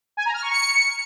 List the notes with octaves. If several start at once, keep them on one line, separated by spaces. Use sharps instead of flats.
G#5
A#5
F6
C#6
C#7